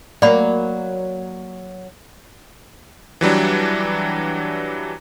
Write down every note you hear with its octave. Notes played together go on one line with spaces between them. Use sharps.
F#3 A#3 D5 B5
E3 F#3 G3 D4